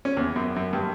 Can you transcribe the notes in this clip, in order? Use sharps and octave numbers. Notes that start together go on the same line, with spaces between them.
C#4
E2
F#2
F#2
G2